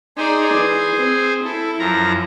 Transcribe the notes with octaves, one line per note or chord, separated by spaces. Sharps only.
D#4 G#4 C5 D5 G#5
E3
C4
E4 A4
F#2 F3 A#5